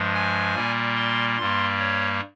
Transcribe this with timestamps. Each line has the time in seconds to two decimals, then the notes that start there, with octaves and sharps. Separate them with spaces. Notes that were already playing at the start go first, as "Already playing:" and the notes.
Already playing: G2 F3 G#3
0.14 G#5
0.55 A#2 G3 A#3
0.97 C6
1.38 G2 G3 A#3 C6
1.79 C#5